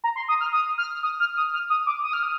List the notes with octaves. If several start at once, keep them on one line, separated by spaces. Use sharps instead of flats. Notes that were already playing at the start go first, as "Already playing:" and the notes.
A#5
C6
D#6
F6
D#6
F6
D#6
F6
D#6
F6
D#6
D6
D#6
F6
D#6